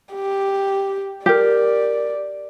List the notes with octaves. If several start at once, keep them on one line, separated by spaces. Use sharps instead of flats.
G4
G4 A#4 D5